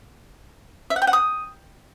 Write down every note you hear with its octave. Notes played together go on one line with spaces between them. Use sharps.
E5
F#5
G5
F#5
D#6